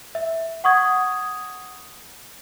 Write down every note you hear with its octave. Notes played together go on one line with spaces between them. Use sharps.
E5
F#5 C#6 D#6 G#6